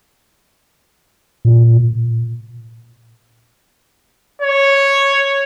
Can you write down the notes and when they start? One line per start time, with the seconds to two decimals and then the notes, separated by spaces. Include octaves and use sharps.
1.45 A#2
4.42 C#5